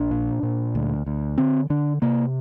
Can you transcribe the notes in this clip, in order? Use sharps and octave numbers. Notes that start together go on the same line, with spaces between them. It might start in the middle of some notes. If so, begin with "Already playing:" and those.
Already playing: A#1 D4
A#2
A#2
D2
D2
D3 C4
D3 D4
C3 A#3